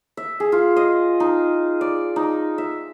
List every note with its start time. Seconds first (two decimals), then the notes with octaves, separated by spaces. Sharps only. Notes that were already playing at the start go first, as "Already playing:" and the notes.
0.17 E5
0.40 G#4
0.52 F4
0.76 D#5
1.20 D#4
1.81 D5
2.16 D#4
2.58 E5